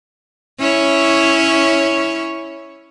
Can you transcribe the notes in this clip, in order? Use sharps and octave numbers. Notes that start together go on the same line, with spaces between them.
C#4 E4 C#5